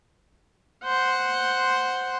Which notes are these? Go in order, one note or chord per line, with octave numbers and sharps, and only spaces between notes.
C5 F#5